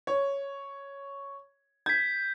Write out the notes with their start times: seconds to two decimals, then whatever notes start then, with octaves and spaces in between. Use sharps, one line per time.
0.07 C#5
1.86 G6 G#6 B6